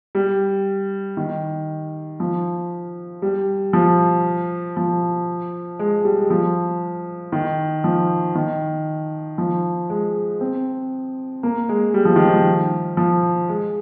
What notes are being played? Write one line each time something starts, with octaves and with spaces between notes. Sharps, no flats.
G3
D#3
F3
G3
F3
F3
G#3
G3
F3
D#3
F3
D#3
F3
G#3
C4
A#3
G#3
G3
F3
D#3
F3
F3
G#3